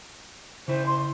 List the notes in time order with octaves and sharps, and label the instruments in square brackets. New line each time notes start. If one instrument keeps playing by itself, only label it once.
[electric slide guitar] C#3 E4 [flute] C5
[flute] C6